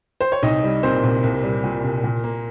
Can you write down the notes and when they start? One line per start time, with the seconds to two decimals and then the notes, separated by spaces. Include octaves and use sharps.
0.21 C5
0.32 C#5
0.43 C2 D#4 D#5
0.63 G3
0.83 A#2 C4 C5
1.03 C2
1.24 C2
1.43 G3
1.64 A#2
1.84 C2
2.04 A#2
2.24 A#3